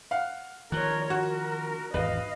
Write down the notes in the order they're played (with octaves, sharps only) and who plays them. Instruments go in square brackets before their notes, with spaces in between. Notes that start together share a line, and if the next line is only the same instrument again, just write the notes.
[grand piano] F5 F#5
[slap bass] D#3 F3 [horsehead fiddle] A#4 C#5 [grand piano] F#6
[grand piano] F#4 [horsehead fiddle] A#4
[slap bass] G#1 E2 [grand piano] B4 [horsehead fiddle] D#5 F5